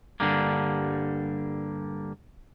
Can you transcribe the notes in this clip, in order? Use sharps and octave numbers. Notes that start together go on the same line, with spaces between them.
G2 B2 D3 G3 A#3